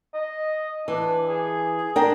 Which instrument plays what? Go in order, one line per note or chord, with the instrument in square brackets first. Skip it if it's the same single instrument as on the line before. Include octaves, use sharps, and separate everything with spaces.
[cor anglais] D#5
[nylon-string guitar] E3 [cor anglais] D4
[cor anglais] G#4
[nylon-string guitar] D4 A#4 G5